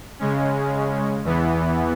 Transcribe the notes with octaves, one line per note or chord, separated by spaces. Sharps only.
C#3 G#3 C#4
E2 E3 B3